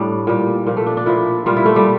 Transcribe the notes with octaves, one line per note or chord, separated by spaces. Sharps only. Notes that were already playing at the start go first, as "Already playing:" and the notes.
Already playing: A2 G3 D4
A#2 G3
A#2 F3
A3
D4
D4
A#2 F3 E4
A#2 G3 F4
E4
A3
G3